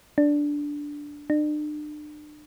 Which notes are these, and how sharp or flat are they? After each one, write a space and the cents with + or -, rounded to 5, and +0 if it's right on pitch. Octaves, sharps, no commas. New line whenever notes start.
D4 -5
D4 +40